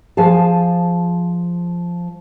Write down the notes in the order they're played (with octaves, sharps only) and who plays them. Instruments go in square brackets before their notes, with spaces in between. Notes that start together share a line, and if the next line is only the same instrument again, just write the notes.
[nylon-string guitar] F3 G#4 F5 G#5 A5